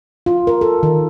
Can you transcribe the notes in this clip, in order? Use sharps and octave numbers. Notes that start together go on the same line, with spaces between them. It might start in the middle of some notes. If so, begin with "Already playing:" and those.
F4
A#4
A4
D#3